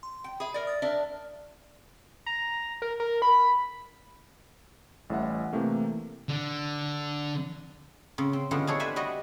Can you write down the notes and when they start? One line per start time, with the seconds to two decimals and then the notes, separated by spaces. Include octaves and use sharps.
0.03 C6
0.24 G5
0.40 G#4 E5 B5
0.54 A#4 D5
0.67 D#6 A6
0.82 D4 A#4 D5 E5
2.26 A#5
2.82 A#4
3.00 A#4
3.22 B5
5.10 A1 A2 G3 E5 F#5
5.53 C3 E3 A3 A#3
6.29 D3
8.18 C#3 C4
8.33 C4
8.51 D3 F3 G3 G#3 B3 C#4
8.67 D4 G#4 A4 C#5
8.80 B4 C5 D5 E5 G5 G#5
8.96 G3 F#4 D5 D#5